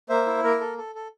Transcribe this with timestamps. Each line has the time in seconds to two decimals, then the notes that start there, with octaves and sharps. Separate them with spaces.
0.09 A#3 C5 E5
0.26 E4
0.43 A#3 A#4
0.61 A4
0.78 A4
0.95 A4